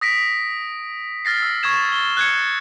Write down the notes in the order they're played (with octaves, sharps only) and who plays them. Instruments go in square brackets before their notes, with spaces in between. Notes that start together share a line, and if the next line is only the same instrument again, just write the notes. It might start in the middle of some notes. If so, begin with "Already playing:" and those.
[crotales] D#6 A#6 B6 D7
F6 A6 A#6 C7
E6
C#6 D#6 G#6 E7
A6 G7
F#6 G#6 C#7